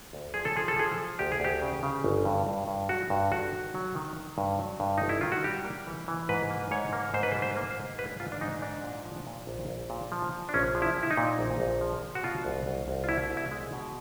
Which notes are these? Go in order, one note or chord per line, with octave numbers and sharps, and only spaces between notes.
D2
F3 G#4
A4
F3 G#4
A4
F3 G#4
F3
D2 G4
G#4
D2 G4
C#3
C#3
G1
G2
G2
G2
F#3 F#4
G2
G1 F#4
D#3
F#3
D#3
D#3
G2
F#3
G2
G1 D#4
E4
D#3 F4
F#4
G3 G4
A#3
E3
E3
G#2 B4
A#3
G#2 C#5
A#3
G#2 C5
B4
C5
G3
C5
A#3
C5
G#2
G3 B4
G#2 F4
D4
G#2 D#4
G#2 D4
A#2
F3
A#2
A#1
A#1
A#2
F3
F3
D4
A#1 C#4
F3
E4
A#2
E4
D#4
A#2
A#1
A#1
F3
F3
F#4
B2 F4
C2
C2
C2
F4
B2 E4
C2
E4
G#3
B2